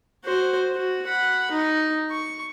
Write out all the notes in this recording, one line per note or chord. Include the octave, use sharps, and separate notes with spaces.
F#4 C5
F#4
F#5 B5
D#4
C#6